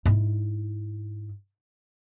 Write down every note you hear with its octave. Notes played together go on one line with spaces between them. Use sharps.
G#2 E4